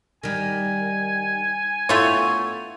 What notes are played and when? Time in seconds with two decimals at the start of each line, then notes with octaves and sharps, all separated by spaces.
0.23 D#3 G3 G#5
1.89 A3 B3 E4 F4 C#5